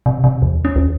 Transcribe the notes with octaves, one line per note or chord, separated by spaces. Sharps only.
C3
C3
E2
C#4
D#2